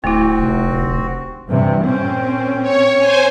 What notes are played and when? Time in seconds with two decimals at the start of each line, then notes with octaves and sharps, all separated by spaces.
0.04 D1 A3 C4 E4 F#4
0.39 F1
1.49 G2 C3 E3
1.84 A#2 C4 C#4
2.62 C#5
2.98 C5 G#5